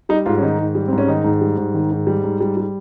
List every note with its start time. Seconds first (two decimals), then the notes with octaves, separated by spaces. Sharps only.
0.09 G3 D#4
0.26 G#2 F4
0.38 C#4
0.42 D#3 D#4
0.59 G#2
0.75 G3
0.88 G#2 C4
0.98 C#4
1.08 D#3 D#4
1.24 G#2
1.41 G3
1.57 G#2
1.74 D#3
1.91 G#2
2.07 G3
2.24 G#2
2.41 G3
2.57 G3